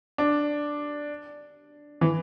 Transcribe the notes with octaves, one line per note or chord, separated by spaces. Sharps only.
D4
E3